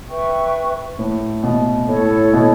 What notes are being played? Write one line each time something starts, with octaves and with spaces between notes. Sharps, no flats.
B4 E5 G5 C#6
A2
B2
A2 E4 A4 C#5
B2